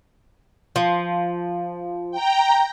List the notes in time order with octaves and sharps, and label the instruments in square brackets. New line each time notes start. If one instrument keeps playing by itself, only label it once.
[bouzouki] F3
[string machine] G5 A#5